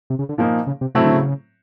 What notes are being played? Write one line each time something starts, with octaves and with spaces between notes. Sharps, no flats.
C3
C#3
D3
A#2 C#3 F3 A#3 D#4
C#3
C3
A2 C3 F#3 A3 C4 E4
D3
C#3